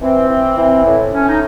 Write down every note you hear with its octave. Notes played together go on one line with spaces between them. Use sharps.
E3 C4
E3
E3
A2
A2 C#4
D#4